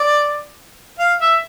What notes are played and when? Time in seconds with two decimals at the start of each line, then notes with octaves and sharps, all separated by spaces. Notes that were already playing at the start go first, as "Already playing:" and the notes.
Already playing: D5
0.99 F5
1.21 E5